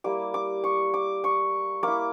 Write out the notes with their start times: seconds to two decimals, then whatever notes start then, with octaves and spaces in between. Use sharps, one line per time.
0.04 G3 A#3 E4 D6
0.34 D6
0.64 C#6
0.94 D6
1.24 C#6
1.83 A#3 E4 D6